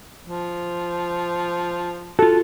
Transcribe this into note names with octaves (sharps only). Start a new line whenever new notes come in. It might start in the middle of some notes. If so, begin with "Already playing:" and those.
F3
F4 F#4 A4